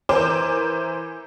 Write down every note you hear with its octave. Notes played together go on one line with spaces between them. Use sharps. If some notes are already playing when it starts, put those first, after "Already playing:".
E3 A#4 C5 D6 G6